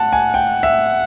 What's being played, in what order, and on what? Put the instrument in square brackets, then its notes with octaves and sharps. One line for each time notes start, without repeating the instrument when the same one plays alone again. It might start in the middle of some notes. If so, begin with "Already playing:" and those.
Already playing: [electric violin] F#5 [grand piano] A5
[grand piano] G#5
G5
E5